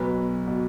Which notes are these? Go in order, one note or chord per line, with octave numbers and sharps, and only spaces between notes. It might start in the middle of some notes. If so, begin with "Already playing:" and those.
Already playing: B1 B2 B4
B2